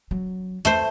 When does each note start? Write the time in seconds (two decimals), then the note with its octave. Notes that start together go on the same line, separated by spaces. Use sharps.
0.11 F#3 C#4
0.65 E2 A3 C5